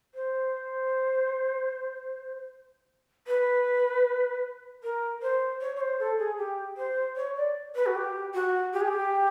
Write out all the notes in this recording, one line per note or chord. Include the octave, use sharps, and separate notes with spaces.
C5
B4
A#4
C5
C#5
C#5
C5
A4
G#4
G4
C5
C#5
D5
B4
F#4
G4
F#4
G4
G#4
G4